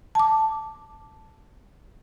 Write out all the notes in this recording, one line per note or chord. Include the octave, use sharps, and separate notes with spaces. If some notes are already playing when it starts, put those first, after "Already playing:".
A5 D6